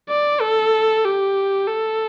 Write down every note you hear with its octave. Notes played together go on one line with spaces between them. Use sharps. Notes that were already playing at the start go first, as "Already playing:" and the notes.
D5
A4
G4
A4